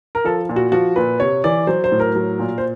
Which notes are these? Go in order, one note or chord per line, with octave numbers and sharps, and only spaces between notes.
A#4
F3 A4
A#2
F#4
F3 F#4
A#2 B4
C3 C#5
E3 D5
F#3 C5
C5
A2
A#4
F#3
A#2
C5